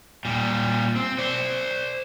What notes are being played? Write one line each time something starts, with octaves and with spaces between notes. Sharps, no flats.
A#2 G3
C4
C5 D5